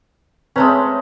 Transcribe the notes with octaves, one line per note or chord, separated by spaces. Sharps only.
G#3 A3 C4 C#4 B4 A#5